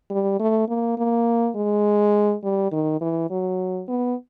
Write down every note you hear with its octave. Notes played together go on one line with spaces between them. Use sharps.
G3
A3
A#3
A#3
G#3
G3
D#3
E3
F#3
B3